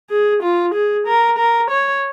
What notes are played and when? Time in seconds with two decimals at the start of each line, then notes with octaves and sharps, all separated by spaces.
0.11 G#4
0.43 F4
0.74 G#4
1.07 A#4
1.38 A#4
1.70 C#5